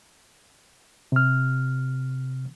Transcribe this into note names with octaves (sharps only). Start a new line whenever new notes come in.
C3 F6